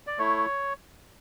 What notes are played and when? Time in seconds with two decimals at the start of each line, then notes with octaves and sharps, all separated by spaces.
0.07 D5
0.18 A3 E4 C#5